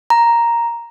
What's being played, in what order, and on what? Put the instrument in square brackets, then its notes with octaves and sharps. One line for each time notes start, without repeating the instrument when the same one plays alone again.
[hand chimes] A#5